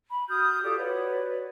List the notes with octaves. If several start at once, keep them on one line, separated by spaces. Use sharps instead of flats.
B5
F#4 D#6 F6 G6
F4 G4 A4 D5
F#4 B4 C#5 D5